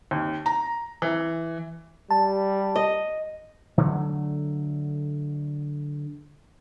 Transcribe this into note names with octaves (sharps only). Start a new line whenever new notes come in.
D#2
A#5
E3
G3 A5
D#5
D3 F#3 A3